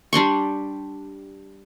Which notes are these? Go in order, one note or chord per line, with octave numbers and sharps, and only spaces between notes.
G3 D4 C6 C#6